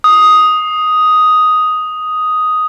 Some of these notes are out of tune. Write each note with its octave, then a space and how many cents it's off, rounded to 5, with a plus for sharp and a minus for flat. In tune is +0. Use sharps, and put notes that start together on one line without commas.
D#6 +5